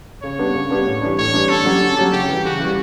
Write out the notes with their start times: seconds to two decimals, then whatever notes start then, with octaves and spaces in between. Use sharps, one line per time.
0.23 C#3 C#5
0.39 G3 B3 D4
0.54 C#3
0.70 G3 B3 D4
0.87 A2
1.02 E3 G3 D4
1.18 A2 C#5
1.33 E3 G3 D4
1.49 D3 A4
1.65 F#3 C#4 G4
1.82 D3
1.97 F#3 C#4 G4
2.13 C#3 G4
2.28 E3 G3
2.45 C#3 F#4
2.60 E3 G3